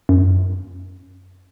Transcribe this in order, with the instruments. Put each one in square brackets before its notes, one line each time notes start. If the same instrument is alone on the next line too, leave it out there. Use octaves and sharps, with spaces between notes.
[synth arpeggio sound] F#2